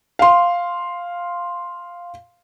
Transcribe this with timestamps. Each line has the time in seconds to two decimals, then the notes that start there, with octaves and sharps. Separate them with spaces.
0.19 F5 C6